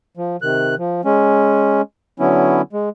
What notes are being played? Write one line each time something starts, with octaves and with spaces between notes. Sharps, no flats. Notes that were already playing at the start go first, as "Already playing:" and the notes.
F3
C3 D#3 F#6
F3
G#3 C#4
D3 F#3 B3 C#4 E4
G#3